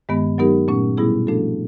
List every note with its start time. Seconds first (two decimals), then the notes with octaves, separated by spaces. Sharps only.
0.09 G2 D#3 G#3 B3
0.38 F#3 B3 D#4 G4 A#4
0.68 A#2 F#3 A3 C#4
0.97 B2 G3 B3 E4 G#4
1.27 F3 A3 D4 F#4 A4